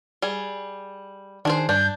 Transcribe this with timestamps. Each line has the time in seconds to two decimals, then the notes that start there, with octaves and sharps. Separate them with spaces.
0.22 G3 G#4
1.45 D#3 D4 G#4 C5
1.69 G2 D4 G6